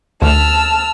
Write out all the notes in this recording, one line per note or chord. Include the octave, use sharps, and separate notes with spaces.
D2 A5 E6 F6